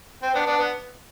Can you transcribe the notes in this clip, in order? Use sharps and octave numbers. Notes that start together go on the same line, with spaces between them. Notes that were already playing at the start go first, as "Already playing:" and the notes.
C4
B3 D4
B3 D4
B3